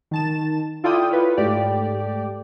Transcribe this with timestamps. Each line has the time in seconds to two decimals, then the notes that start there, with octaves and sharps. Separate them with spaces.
0.11 D#3 A5 E7
0.84 E4 F4 A4 D5 G5 D#6
1.11 F4 B4 C#5
1.37 G#2 A3 G4 D5